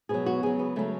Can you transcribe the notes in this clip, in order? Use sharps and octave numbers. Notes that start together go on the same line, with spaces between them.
B2 F#3 G#4
F#4
C#3 F#3 G#4
B3
C#3 F#3 A3